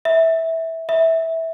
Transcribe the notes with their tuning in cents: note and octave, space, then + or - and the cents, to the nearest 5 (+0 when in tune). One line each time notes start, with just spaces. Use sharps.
E5 -15
E5 -15